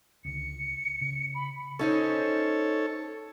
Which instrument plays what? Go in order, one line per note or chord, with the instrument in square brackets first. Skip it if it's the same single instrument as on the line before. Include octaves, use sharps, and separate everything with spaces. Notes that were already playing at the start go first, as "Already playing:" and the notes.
[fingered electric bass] C#2 D3 [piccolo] C#7
[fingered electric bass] C#3
[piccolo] B5
[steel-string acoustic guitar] C#4 D#4 C5 [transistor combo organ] A4 C#5